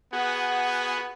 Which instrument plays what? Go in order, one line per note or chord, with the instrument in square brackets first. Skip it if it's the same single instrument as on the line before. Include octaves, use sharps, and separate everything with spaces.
[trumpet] B3 [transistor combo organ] F#4 G#4